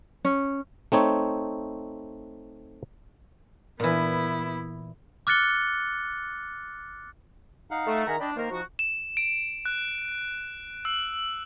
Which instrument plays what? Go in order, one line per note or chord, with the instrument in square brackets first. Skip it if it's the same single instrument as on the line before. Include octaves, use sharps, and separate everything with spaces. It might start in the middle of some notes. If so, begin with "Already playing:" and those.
[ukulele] C#4
[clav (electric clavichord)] A3 C4 D#4 C#5
[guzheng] A#2 E3 [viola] B3 E4
[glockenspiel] D6 F6 F#6 A6 C#7 G7
[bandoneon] D#4 F5 F#5
[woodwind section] A3
[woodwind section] D#3 A#5 [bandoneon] G#4 E5 F#5
[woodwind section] D4 [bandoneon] D#5 G5 B5
[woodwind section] D#3 A#3 A#4 [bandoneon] C5 C6
[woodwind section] F3 F#4 [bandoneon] D#4
[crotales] E7
D7
F#6
E6